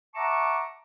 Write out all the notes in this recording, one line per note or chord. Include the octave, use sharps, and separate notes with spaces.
E5 F#5 A5 A#5 C#6 D6